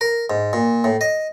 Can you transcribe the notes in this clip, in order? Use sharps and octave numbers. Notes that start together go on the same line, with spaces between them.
A#4
G#2
A#2
A2
D#5